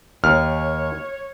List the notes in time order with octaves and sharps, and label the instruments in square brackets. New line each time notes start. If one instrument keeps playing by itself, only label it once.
[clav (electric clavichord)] D#2 [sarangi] C#5 [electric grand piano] F6